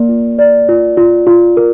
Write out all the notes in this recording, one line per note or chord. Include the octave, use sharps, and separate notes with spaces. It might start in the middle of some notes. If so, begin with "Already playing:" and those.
Already playing: A#3 A#4 D5
F4
D5
F4
F4
F4
A#4